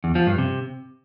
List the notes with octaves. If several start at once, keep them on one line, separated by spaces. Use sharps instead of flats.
E2
F3
G2
C3